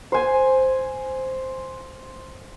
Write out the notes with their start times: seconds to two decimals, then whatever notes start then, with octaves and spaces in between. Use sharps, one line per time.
0.12 C5 G#5